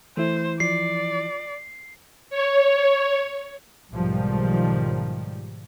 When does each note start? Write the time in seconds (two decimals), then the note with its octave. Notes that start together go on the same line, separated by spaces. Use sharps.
0.17 E3 A3 E4 C5
0.60 F3 D5 C7
2.30 C#5
3.91 B1 G#2 D#3 F3 G3